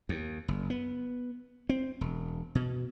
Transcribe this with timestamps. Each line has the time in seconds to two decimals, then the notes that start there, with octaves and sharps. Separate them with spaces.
0.09 D#2
0.48 F#1
0.70 B3
1.69 C4
2.01 E1
2.55 B2